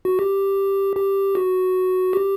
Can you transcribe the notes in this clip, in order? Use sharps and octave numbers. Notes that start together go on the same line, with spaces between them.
F#4
G4
G4
F#4
G4